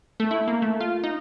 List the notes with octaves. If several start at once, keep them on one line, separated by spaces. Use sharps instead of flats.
A3
E4
A#3
A3
F4
D#4